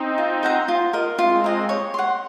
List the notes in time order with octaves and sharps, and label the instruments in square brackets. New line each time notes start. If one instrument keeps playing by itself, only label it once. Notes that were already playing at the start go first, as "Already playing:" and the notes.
Already playing: [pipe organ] C4 D#4
[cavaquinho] F4
C5 F#5 A#5
F4
A#4 D#5
[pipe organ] G#3 C4 [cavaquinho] F4
[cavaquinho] A#4 D#5
C#5
F#5 C6